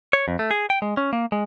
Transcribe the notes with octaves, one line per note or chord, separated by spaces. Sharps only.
C#5
F2
A3
G#4
G5
G#3
C#4
A#3
G#3